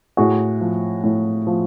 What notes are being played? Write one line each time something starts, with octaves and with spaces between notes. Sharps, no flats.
A2 F#4 G#4
F3
A2
F3